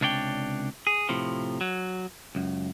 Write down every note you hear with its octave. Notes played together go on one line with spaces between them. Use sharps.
C#2 C3 D4 C#5 D5 G5
G#4
A2 C3 F3
F#3
C#2 F#2